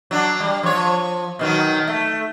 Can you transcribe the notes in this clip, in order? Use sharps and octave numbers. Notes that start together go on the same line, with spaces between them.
F#3 D4
G3
F3 C#5
B2 D#3 F#3
A3